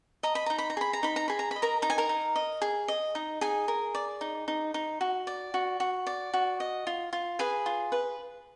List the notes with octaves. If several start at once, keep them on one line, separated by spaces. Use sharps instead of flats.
D#5 A#5
B5
D#4 A#5
B5
A#5
G#4 B5
A#5
D#4 B5
A#5
G#4 B5
A#5
B5
D#5
A#4 A#5
D#4 A#5
G#5
A#4 A#5
D#4
D#5
G#4
D#5
D#4
D#4 G#4 G#5
A#4
D5
D#4
D#4
D#4
F#4
D5
F#4
F#4
D5
F#4
D#5
F4
F4
G#4 B4 G#5
F4
B4